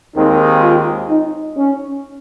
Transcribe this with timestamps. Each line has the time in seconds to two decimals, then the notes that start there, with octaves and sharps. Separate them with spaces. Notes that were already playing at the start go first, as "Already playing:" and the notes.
0.16 D#2 D#3 G#3 C4 D#4
0.62 F4
1.09 D#4
1.57 C#4